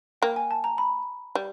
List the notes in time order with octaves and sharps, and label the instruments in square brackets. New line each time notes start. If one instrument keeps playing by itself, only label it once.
[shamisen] A#3 [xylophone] G5
[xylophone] G#5
A5
A#5
B5
[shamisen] G3